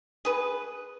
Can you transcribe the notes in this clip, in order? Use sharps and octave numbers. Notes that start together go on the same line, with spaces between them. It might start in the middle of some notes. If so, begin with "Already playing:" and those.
G#4 B4